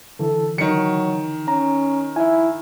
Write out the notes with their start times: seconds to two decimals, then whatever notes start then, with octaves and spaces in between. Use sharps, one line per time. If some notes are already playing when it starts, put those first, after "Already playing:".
0.19 D3 E3 A4
0.58 D#3 F#3 C#7
1.48 C#4 A#5
2.16 E4 E5 G#5